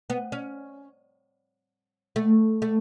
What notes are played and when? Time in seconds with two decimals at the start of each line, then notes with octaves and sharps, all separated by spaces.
0.10 B3
0.32 C#4
2.16 A3
2.62 A3